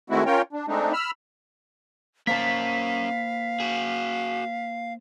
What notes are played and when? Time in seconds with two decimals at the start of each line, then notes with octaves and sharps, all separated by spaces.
0.10 D#3 G#3 A3 C4 E4 F#4
0.26 C#4 F4 A#4 C#5 G5
0.53 D4
0.68 G#3 A3 C4 D4 D#4
0.93 B5 E6 F6
2.27 A#3 C#4 A#4 C5 F5 A5 B6
3.60 F#4 G#4